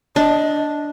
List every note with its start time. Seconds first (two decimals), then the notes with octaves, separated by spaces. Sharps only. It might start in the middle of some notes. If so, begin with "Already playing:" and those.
0.16 D4 D#5